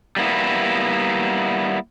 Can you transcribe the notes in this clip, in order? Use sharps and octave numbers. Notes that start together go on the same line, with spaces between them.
G3 A#3 B3 E4